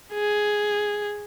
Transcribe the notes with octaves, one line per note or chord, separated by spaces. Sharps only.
G#4